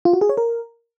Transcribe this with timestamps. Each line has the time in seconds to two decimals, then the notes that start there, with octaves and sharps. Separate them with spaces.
0.05 F4
0.13 F#4
0.21 G#4
0.29 C#5
0.37 A#4